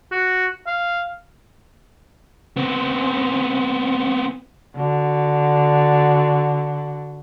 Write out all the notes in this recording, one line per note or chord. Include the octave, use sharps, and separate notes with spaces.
F#4
F5
B3 C4
D3 F#4